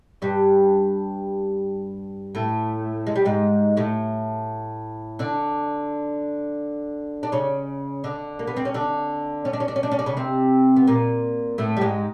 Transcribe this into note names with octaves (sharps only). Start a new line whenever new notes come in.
G2 G3
A2 A3
G#3
G3
G#2 G#3
A2 A3
D3 D4
D4
C#3 C#4
D3 D4
A#3
B3
C4
C#4
D3 D4
C#4
D4
C#4
D4
C#4
D4
C#4
D4
C#3 C#4
C3 C4
B3
A#2 A#3
A2 A3
G3
G#2 G#3